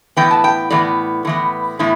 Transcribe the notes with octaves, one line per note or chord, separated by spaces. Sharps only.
A2 E3 B3 G5
A5
G5
A2 E3 B3 D5
A2 E3 B3
A2 E3 B3 E4